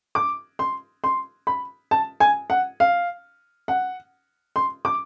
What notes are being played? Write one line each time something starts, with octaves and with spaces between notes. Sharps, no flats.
D6
C6
C6
B5
A5
G#5
F#5
F5
F#5
C6
D6